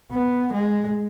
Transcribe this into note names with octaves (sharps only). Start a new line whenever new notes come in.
B3
G#3